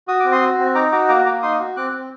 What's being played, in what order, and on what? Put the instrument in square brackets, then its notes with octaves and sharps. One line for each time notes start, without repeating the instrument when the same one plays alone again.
[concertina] F#4 D#6
C4 D6
C6 D#6
F#4
C4
D#4 A#5 D6
F#4 A#5 D6
A#3 A#5 D6
A#3 A#5 D6
D#4 C6 D#6
F#4
C4 D6 F#6
C4